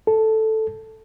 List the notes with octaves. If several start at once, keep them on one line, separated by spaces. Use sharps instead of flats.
A4